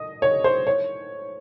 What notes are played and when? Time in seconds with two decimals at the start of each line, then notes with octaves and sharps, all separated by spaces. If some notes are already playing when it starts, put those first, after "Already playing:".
Already playing: D#5
0.22 C#5
0.44 C5
0.67 C#5